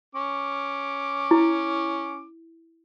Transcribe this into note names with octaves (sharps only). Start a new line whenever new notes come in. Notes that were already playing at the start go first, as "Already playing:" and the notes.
C#4 D6
E4